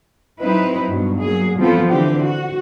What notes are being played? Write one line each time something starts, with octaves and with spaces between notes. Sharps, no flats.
F#3 C4 D#4 E4 B4
G2 B2 F#3
F#3 A#3 G#4
E3 F3 B3 C4 A4
D3 E3 C4 G4
F#4